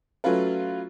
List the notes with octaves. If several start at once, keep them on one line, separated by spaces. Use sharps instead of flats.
F#3 A3 C#4 F4 B4